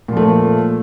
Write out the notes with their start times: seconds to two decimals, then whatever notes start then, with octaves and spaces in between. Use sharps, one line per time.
0.08 A#2
0.13 F3
0.17 A3